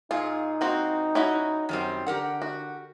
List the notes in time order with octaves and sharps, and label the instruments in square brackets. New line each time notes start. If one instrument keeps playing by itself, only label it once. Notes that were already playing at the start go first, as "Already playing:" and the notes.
[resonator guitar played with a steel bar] A#2 G#4 [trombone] D#4 [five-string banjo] F4
[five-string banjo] A#3 C4 F#4
C#4 E4 F#4
[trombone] F#2 [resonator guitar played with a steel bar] D#3 G3 C4
[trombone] D3 [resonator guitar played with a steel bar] G4 A#4 F#5
[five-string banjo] F#4